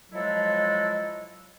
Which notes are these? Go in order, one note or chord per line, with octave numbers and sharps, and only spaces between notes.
F3 F#3 G#3 E4 A4 D#5